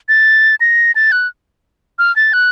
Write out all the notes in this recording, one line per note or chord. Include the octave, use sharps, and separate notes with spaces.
A6
A#6
A6
F#6
F6
A6
F#6